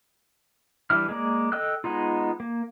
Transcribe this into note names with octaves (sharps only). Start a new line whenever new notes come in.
E3 G3 D4 E4 F6
G#3 A#3 D5
A4 D#5 G5 E6 F#6
G#3 B3 D#4 F4
A#3